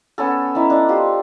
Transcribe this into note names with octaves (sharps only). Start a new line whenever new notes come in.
B3 C#4 A4
C#4 D#4 E4
D4 D#4
F4 G4 C5